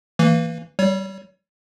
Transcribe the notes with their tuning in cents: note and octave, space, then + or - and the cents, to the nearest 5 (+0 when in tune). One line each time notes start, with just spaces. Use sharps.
E3 +0 A#3 -20
G3 -15 C#5 +20